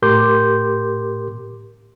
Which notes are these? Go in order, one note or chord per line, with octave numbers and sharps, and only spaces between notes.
A2 G4 A#4 C6 D6 G6